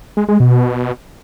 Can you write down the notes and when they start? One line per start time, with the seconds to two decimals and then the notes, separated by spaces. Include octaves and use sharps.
0.17 G#3
0.29 G#3
0.40 B2